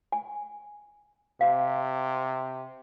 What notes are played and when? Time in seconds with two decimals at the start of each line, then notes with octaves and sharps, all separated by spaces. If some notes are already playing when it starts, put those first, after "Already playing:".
0.12 G#5
1.41 C3 F5